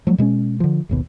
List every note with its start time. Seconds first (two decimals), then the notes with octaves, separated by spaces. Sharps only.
0.07 F3 F#3 A3
0.18 B2 G#3 A3 C#4
0.60 D3 F3
0.89 G#1 D#2 B2